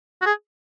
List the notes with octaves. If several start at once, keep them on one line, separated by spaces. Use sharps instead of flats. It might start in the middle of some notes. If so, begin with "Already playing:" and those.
F#4
G#4